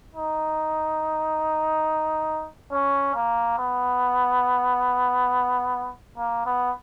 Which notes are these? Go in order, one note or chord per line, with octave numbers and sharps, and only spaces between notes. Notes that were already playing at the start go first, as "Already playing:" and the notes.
D#4
C#4
A#3
B3
A#3
B3